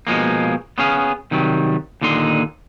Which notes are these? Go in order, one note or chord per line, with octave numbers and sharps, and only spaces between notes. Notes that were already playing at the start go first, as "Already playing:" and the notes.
B2 F3 G#3 A#3
B3 C#4 G#4 F5
C3 D#3 F#3 G3
D#2 A#2 D3 D#4 C6